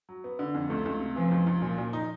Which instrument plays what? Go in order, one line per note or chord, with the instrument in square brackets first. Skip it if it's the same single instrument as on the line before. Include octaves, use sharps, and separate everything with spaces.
[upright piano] F#3
B3
D3
F2
[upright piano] C#2 [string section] A3
[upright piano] C#2
C3
[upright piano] E3 [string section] F3
[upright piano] C#2
C#2
[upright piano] A#2 [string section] F3
[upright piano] A#2
D#4